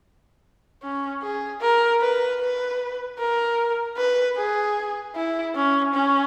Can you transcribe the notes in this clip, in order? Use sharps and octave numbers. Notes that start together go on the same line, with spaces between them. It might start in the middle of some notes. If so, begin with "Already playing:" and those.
C#4
G#4
A#4
B4
B4
A#4
B4
G#4
E4
C#4
C#4